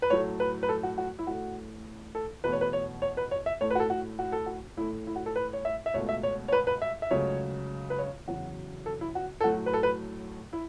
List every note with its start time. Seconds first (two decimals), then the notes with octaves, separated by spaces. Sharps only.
0.02 B4
0.10 A2 F#3 A3 C#5
0.40 B4
0.63 B4
0.69 A4
0.83 F#4
0.98 F#4
1.19 E4
1.27 A2 A3 F#4
2.15 A4
2.44 E2 B2 A3 B4
2.52 C#5
2.61 B4
2.73 C#5
3.02 C#5
3.17 B4
3.31 C#5
3.46 E5
3.61 A2 A3 C#5
3.70 B4
3.75 F#4
3.80 A4
3.90 F#4
4.19 F#4
4.32 A4
4.46 F#4
4.77 A2 A3 E4
5.07 E4
5.16 F#4
5.26 A4
5.36 B4
5.53 C#5
5.65 E5
5.86 E5
5.94 C#2 B2 A3 C#5
6.09 E5
6.23 C#5
6.48 C#5
6.52 B4
6.67 B4
6.82 E5
7.02 E5
7.11 C#2 C#3 F#3 A3 C#5
7.90 B4
7.98 C#5
8.28 E2 C#3 F#3 F#4
8.86 A4
9.01 E4
9.15 F#4
9.41 A4
9.44 A2 F#3 A3 F#4
9.66 B4
9.74 A4
9.83 B4
10.53 E4